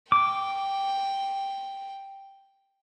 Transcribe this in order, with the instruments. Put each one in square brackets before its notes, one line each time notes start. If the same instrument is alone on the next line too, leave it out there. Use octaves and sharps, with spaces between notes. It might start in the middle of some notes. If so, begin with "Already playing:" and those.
[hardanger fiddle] G5 [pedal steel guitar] D6